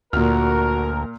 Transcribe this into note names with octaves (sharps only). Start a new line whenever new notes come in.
D2 A#2 F#4 A#4 F6